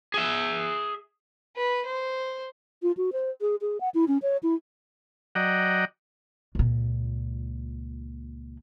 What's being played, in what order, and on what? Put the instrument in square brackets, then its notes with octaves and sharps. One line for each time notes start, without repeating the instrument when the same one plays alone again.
[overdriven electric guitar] G#4 E5
[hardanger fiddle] B4
C5
[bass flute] F4
F#4
C5
G#4
G#4
F#5
E4
C#4
C#5
E4
[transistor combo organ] F#3 D5 D#5 F#5 G5 A#5
[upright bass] C#2 A#2